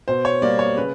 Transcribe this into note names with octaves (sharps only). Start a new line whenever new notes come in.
B2 C5
C#5
G3 A#3 D5
C#5
C#3 B4